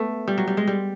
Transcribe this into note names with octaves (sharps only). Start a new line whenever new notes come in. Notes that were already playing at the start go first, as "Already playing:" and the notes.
Already playing: A3 B3
G3
F#3
G3
G#3
G3